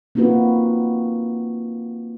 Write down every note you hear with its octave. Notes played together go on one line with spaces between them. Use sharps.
A#3 C4 D#4 F4 F#4 B4